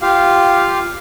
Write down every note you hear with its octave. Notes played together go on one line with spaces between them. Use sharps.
F4 G4 F5